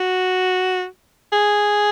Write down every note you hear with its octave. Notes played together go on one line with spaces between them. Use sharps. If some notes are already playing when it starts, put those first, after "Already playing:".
Already playing: F#4
G#4